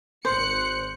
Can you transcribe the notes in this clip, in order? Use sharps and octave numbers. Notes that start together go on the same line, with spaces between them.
G#1 C5 F#6 C#7